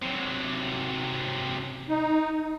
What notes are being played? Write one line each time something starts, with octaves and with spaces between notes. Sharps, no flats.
C3 F#3
D#4